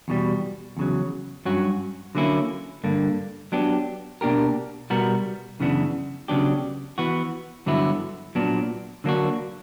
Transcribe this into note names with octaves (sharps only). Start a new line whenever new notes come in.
E2 B2 G3
E2 C#3 F#3
G2 F#3 C#4 F#4
D3 F#3 A#3 C#4 E4
G2 D3 A#3
F#3 B3 D4 G4
B2 A#3 D4 G4 A#4
B2 G3 B3 F#4 A#4
F#2 C#3 E3 B3 D4
C#3 F#3 B3 D4 G4
E3 B3 F#4
G2 D3 F#3 B3 E4
A#2 F#3 B3 D4
D3 F#3 A#3 D4 F#4